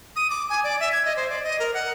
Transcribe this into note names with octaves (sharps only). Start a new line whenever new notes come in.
D#6
D6
G#5
D5
E5
G#6
D#5
C5
D5
D#5
A#4
F#5